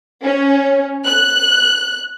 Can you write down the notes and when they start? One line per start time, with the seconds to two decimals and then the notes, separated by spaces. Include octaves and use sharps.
0.24 C#4
1.05 F#6